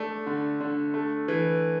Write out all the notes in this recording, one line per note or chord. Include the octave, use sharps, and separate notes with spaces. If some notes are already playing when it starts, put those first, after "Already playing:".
Already playing: A3 D4
D3
D3
A3
E3